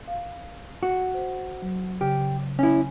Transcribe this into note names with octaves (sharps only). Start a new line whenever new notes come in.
F5
F#4
C5
F#3
C#3 G4
C#4 E4 G#5